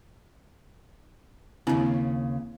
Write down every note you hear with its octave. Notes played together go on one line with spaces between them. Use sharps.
D#2 C#3 C4 D4 E4